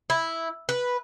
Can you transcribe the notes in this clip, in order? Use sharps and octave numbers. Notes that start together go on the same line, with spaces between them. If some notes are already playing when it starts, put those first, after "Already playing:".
E4
B4